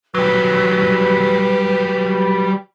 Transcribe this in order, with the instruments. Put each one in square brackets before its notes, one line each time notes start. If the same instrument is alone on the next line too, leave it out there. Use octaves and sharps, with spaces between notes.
[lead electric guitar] F#3 G3 [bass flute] B4